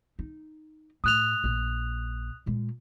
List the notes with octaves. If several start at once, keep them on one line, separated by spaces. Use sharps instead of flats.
D#4
A2 D#6 F#6 F7
A#1
A#2 G#3